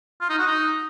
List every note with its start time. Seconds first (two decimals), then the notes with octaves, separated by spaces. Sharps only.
0.21 F4
0.30 D#4
0.38 F#4
0.47 D#4